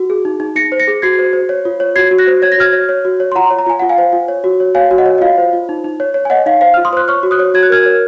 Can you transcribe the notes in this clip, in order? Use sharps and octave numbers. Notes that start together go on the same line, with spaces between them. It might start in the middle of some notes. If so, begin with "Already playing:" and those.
Already playing: F#4
G#4
D#4
D#4
D#4 A#6 C#7
C5
A#6 C#7
G#4
F#4 G#6 C7
C5
C5
C#5
F4
C#5
F#4 G#6 C7
F#4
F#6 A#6
C5
C#5 G#6
A#6
F#4 F6 G#6
C#5
C#5
F#4
C#5
C6
F4 F#5 A#5
C#5
A#5
F4 G#5
F4 F#5
F5 G#5
C5
F4
C#5
F#4
C#5
C#5 F5 G#5
F#4
D#5 F#5
C#5
D#5
F4 F5
C5
F4
D#4
D#4
C#5
C#5
G#5
C#5 D#5 F#5
D#4 F5
C5 F5
F4 F6
C6 D#6
C5 F#6
C#5 C#6 F6
F#4
D#6 F#6
C#5
F#4 G#6
F#6
A#4 F6 G#6
C#5